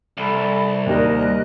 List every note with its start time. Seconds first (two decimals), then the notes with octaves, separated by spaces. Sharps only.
0.17 C2 A4 B5
0.86 D#2 G3 A#4 D#5 F#6